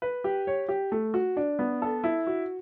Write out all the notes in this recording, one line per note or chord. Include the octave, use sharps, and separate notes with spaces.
B4
G4
C#5
G4
A3
F#4
D4
B3
A4
E4
F#4